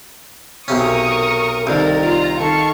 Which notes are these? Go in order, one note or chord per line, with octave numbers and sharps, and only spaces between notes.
B1 C3 C#4 A#4 C#6 D#6
C2 D#3 A4 A#4 D5 F5 D6
F4 F5 A#5
D#3 A4 F5 A5 C#6